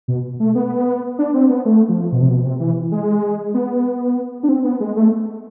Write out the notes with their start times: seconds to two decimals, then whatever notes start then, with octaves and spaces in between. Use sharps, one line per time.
0.08 B2
0.40 A3
0.55 B3
1.19 D4
1.34 C4
1.49 B3
1.65 A3
1.89 F3
2.12 B2
2.21 C3
2.29 B2
2.45 C3
2.60 E3
2.92 G#3
3.54 B3
4.43 D4
4.49 C4
4.64 B3
4.80 G#3
4.96 A3